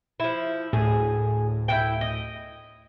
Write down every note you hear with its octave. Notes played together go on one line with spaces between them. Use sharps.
F3 E4
D2 A2 G#4
E4 F#4 G5
D#5